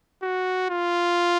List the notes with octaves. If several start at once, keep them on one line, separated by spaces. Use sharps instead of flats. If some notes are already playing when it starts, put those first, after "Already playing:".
F#4
F4